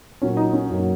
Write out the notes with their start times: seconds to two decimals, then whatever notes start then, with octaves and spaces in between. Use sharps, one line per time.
0.22 A#2 F#3 A#3 C#4
0.37 D#4
0.53 C#4
0.70 F#2 F#3 A#3